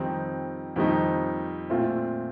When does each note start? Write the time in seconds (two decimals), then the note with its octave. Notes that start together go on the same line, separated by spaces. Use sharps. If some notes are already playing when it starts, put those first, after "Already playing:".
Already playing: F2 D#3 G3 C4 D#4
0.76 F2 D#3 G3 C4 D#4
1.70 A#2 A3 C4 F4